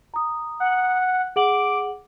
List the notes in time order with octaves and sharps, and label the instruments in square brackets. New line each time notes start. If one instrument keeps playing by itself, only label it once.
[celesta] A#5 D#6
[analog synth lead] F#5
[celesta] G#4 F#5 F#7 [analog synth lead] D6